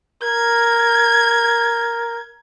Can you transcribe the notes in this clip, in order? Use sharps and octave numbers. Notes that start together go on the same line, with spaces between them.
A#4 G#6